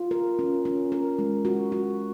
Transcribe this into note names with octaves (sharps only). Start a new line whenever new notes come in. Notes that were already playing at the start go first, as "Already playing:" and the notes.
Already playing: F4
A#4
C#4
C#4
A#4
G#3
F#4
F#4